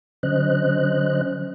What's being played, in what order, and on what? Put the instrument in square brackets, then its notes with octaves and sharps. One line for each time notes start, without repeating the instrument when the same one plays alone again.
[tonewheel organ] D3 F#3 C#4 C5 D#5 F#6